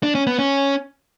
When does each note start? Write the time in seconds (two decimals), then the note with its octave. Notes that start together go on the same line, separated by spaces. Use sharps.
0.03 D4
0.15 C#4
0.27 B3
0.39 C#4